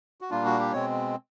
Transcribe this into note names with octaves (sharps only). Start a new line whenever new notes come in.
F#4
A#2 G3 A#3 D4 F4
F#4
G4
B2 G#3 C4 C#5